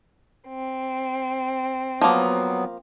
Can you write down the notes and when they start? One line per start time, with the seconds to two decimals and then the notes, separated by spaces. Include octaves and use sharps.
0.47 C4
2.01 F3 F#3 A#3 B3